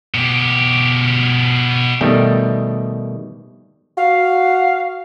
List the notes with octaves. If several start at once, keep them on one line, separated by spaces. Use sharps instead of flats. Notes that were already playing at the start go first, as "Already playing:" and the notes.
B2 G4
B2 D#3 G3 A3
F#4 F5